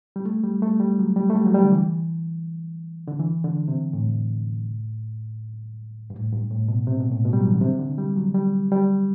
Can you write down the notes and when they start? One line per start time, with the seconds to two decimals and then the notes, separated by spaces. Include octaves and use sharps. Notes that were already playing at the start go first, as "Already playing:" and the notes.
0.16 G3
0.25 A3
0.43 G3
0.62 A3
0.80 G3
0.99 F#3
1.16 G3
1.30 A3
1.36 G3
1.46 F#3
1.54 G3
1.64 D3
1.72 E3
3.07 D3
3.20 E3
3.44 D3
3.68 C3
3.93 A2
6.10 G2
6.14 A2
6.32 G2
6.51 A2
6.68 B2
6.87 C3
7.00 B2
7.12 A2
7.25 B2
7.33 G3
7.40 F#3
7.47 E3
7.54 D3
7.61 C3
7.79 D3
7.98 G3
8.16 F#3
8.34 G3
8.72 G3